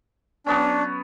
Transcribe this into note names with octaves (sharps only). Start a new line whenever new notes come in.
F#3 B3 C#4 D4